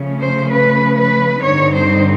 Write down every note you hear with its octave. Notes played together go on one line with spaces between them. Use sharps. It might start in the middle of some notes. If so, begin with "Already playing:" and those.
Already playing: C#3 F3 A3 C#4
C5
B4
B4
G2 D3 G3 C4 D#4 C#5
C5